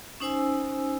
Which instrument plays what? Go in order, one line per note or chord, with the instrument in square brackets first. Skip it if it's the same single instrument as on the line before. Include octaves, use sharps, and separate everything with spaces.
[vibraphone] C#4 D#4 C5 G#5 E6